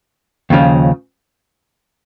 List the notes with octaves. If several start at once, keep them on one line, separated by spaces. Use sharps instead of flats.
D#2 C#3 F3